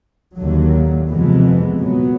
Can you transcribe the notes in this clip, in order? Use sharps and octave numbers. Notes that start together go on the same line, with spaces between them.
D#2 D3 F#3
F2 C3 E3 G#3 B3
A#2 F#3 B3